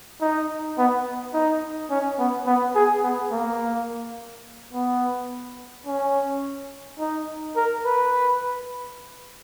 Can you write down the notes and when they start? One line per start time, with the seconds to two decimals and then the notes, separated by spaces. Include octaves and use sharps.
0.21 D#4
0.78 B3
1.34 D#4
1.91 C#4
2.19 B3
2.47 B3
2.75 G#4
3.03 B3
3.31 A#3
4.73 B3
5.86 C#4
7.00 D#4
7.56 A#4
7.85 B4